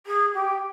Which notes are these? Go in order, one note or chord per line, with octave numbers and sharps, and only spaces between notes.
G#4
G4